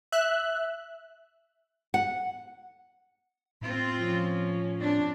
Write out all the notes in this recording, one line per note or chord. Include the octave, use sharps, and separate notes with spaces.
E5 F#6
F#5
A2 C4 F4
F3 C#4
C4 D4